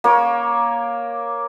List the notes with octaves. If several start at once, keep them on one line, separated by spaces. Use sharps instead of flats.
A#3 C#5